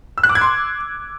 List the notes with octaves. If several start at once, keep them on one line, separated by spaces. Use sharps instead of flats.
E6
F#6
D6
G#6
C6